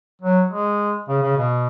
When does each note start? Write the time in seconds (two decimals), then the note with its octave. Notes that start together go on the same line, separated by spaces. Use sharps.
0.21 F#3
0.51 G#3
1.08 C#3
1.22 C#3
1.37 B2